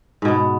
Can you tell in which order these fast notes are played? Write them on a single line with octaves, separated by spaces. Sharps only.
G#2 B2 B3